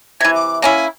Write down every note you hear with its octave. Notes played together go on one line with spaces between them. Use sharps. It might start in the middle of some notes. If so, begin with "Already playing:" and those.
C3 E3 G#6
D6
A#3 C#4 E4 G#5